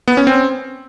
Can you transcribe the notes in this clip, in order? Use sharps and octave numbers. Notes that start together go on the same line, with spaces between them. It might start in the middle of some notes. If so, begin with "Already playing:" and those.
B3
C#4
C4